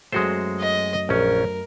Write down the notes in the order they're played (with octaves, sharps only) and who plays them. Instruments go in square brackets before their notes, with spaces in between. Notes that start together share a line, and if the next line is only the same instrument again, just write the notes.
[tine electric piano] F#2 F#3 A3 [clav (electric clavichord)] G#3 F#4 C5
[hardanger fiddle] D#5
[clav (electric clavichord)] A#1 C#4 [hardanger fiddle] A#4